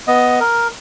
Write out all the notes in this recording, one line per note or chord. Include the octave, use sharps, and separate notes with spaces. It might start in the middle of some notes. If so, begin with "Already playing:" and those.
B3 D#5
A#4